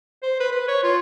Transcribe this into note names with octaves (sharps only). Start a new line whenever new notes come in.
C5
B4
B4
C#5
F4